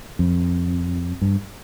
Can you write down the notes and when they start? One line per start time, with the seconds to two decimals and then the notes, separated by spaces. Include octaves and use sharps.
0.19 F2
1.21 G2